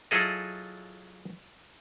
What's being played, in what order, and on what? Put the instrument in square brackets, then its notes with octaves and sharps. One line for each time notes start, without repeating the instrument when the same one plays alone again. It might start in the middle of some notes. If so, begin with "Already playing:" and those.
[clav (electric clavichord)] F#3 E4 F4 G#4 A4 D#5